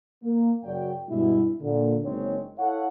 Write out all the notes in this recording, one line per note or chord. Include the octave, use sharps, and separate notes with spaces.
A#3
F#2 C#3 F#4 D5 G5
G2 B2 G#3 E4
A#2 D3
F#1 G#3 C4 D4 D#4 C#5
E4 A4 C#5 F5 F#5